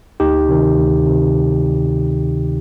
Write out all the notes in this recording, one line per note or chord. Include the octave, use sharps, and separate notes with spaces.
D2 D#4 G4
C3 D#3
D2
C3 D#3